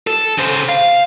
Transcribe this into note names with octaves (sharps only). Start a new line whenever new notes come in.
A4
C#3 C5
F5